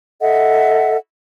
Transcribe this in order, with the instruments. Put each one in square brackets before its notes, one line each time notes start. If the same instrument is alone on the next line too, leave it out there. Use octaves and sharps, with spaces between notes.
[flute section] A4 D#5 E5 F#5